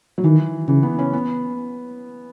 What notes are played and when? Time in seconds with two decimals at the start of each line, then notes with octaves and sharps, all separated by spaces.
0.18 F#3
0.24 D#3 E3
0.68 C#3 E3
0.83 B3
0.99 C#4
1.13 B3